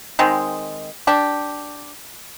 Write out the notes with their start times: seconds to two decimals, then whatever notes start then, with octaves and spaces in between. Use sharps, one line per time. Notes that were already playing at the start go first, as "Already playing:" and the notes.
0.19 D#3 G#3 C4
1.07 D4 G4